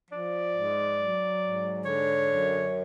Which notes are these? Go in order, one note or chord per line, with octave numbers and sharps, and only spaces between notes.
F3 D5
G#2
F#3
G#2
D3 C#5
F#2